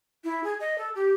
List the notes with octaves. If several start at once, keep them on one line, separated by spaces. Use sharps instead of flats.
E4
G#4
D#5
A4
G4